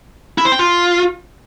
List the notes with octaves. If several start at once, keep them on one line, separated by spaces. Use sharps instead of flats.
E4
C5
G5
F4